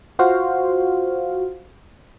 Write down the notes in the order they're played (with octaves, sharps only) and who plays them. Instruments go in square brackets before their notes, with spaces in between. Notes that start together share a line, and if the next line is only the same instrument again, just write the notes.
[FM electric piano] F4 F#4 C5 F5